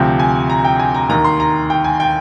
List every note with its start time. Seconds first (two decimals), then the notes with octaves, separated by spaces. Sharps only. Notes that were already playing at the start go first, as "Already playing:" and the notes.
Already playing: D2 C3 F3 G5
0.19 G#5
0.50 A#5
0.64 G5
0.79 G#5
0.94 A#5
1.09 D#2 D#3 A#5
1.25 C6
1.40 A#5
1.70 G5
1.84 G#5
2.00 G5